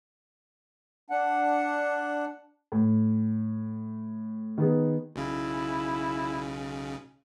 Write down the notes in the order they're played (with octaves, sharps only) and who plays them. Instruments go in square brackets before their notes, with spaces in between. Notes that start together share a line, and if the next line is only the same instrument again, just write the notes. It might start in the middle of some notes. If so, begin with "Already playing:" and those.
[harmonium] D4 F#5
[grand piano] A2
D#3 B3 G#4
[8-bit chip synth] B1 C#3 [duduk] E4